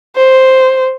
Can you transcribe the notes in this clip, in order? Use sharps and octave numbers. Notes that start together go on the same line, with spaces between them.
C5